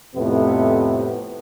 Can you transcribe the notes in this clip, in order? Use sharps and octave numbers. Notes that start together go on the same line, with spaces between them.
F2 A2 C3 B3